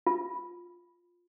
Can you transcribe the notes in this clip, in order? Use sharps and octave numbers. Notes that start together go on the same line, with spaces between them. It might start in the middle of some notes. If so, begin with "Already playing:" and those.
F4